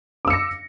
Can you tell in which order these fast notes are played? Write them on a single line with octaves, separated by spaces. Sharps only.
D6 E6 C#7 A#6